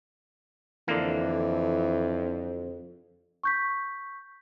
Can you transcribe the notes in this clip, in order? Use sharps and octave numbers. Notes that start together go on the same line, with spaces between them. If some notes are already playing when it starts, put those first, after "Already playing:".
F2 D3 E3 A#3
C#6 G6 B6